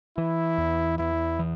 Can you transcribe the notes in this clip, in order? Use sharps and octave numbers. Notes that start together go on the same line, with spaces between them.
E3 E4
E2
E2 E4
E3